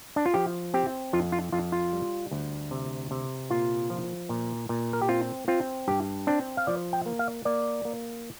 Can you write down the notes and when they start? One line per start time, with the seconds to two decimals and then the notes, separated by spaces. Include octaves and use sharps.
0.16 D4
0.26 F4
0.34 F3 G4
0.74 C4 G4
1.13 F2 F4
1.32 F4
1.52 F2 F4
1.72 F4
1.93 G3
2.31 D2
2.71 C3
3.11 C3
3.50 A#2 F4
3.90 F3
4.29 A#2
4.69 A#2
4.93 A#4
5.02 G4
5.09 C4 F4
5.48 C4 F4
5.88 G2 G4
6.27 C4 D4
6.57 F5
6.67 F3 D5
6.93 G5
7.06 A#3
7.19 F5
7.45 A#3 D5
7.85 A#3